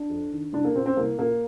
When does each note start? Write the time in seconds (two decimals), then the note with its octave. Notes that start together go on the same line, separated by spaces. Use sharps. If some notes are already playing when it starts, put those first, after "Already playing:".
Already playing: D4
0.10 F2
0.32 D#3
0.53 C2 D4
0.65 A#3
0.75 A#2 C4
0.86 C4
0.97 C2 A#3
1.18 A#2 A#3